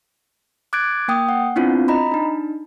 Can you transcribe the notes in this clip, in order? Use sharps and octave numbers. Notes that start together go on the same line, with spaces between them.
D6 F#6 G#6 A6 D7
A#3 G5 D#6
F#5
B3 C4 D4 E4 F4
D#5 A#5 B5
D4 D#4